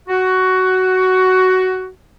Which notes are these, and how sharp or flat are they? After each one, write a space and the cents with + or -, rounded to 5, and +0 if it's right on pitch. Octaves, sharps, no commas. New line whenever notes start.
F#4 +10